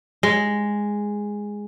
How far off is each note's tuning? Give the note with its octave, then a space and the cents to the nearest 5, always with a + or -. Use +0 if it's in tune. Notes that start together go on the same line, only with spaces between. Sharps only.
G#3 -5